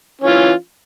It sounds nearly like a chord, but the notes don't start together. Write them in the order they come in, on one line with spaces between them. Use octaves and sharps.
C#4 E3 F4